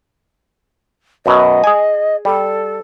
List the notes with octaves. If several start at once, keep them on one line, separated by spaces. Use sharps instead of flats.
F#2 B2 F#3 D#5
G#4 G#5
G3 A4